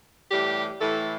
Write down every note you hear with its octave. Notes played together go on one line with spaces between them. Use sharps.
A2 E3 G3 G4
A2 E3 A3 A4